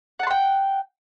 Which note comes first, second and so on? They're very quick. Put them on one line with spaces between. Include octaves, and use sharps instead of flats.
F#5 A5 C6 G5